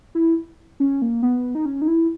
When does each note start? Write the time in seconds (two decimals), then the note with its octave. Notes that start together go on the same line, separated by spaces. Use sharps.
0.15 E4
0.80 C#4
1.02 A#3
1.23 B3
1.55 D#4
1.66 C#4
1.82 D#4
1.88 E4